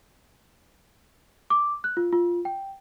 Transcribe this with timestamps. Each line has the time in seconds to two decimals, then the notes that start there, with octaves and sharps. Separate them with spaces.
1.50 D6
1.84 F#6
1.97 F4
2.13 F4
2.45 G5